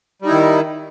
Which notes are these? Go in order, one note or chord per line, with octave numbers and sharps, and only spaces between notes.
D#3 G3 D#4 E4